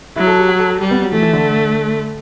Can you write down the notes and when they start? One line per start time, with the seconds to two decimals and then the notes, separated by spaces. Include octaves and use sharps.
0.16 F#3 E4
0.27 A4
0.39 G4
0.48 F#4
0.59 A4
0.70 A4
0.80 G3 G4
0.91 B3
1.02 F#3
1.12 E3 A3
1.22 E3
1.33 D3